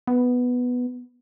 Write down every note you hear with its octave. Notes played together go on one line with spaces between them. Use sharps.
B3